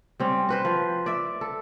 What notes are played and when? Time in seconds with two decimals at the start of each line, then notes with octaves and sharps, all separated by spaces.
0.20 G3 C4 C#4
0.49 F#4 B4 C5
0.65 F3
1.06 D5 E5
1.41 A4